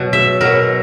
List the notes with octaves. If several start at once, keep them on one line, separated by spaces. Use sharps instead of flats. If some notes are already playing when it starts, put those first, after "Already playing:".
Already playing: B2 F#3
E5
B2 F#3 A#4